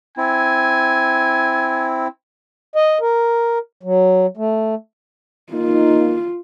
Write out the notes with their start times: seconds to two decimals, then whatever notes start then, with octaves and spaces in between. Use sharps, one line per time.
0.17 C4 E4 G#5
2.75 D#5
3.01 A#4
3.83 F#3
4.37 A3
5.53 A#3 D#4 F4